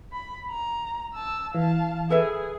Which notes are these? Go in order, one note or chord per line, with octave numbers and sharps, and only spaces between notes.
B5
A#5
A5 E6
E3 F5 A5
G#4 A4 B4 E5